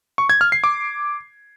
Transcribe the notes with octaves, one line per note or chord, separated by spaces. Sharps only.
C#6
G#6
F6
C7
D6